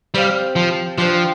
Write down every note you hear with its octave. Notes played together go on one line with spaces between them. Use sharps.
G3 C4 G4 F5
F3
F3 D4 G4 C5